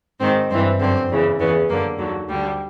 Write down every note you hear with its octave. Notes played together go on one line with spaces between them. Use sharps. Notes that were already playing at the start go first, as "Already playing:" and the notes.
G#2 D#3 C4
G2 E3 C4
F#2 D3 C4
E2 C#3 E3
E2 C#3 E3 B3
F#2 D3 A#3
D#2 D3 F#3
D2 D3 G3